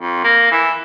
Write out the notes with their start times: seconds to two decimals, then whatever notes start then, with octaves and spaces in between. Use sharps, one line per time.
0.02 F2
0.24 A#3
0.51 E3